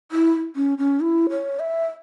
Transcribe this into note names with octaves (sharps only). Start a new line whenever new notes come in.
E4
C#4
C#4
E4
C#5
E5